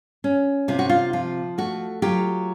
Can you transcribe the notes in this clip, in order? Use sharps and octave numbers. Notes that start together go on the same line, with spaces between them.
C#4
C3 F4
F#4
F4
F3 F4
A3 F#4
F#3 F4 G4